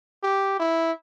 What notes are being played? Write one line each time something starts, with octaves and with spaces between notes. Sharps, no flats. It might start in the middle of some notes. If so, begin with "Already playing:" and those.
G4
E4